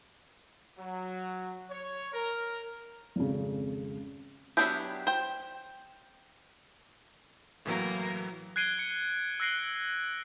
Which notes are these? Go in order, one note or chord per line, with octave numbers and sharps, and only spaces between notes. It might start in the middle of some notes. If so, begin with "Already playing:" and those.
F#3
C#5
A#4
G#1 F2 C#3
F#3 B3 D4 E4 G4
C5 G5
A2 E3 F#3 A#3 A#4
F#6 G#6 C7 D7 D#7 G7
C#7
E6 F#6 A#6 C7 D7 G7